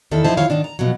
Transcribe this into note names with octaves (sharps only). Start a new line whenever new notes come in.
E2 D#3 E4 A4
F#2 F3 D#4 E4 C5 A5
D#3 E4 F4 C#5 F5
G#2 D#3 D4
A#5
B2 F3 F#3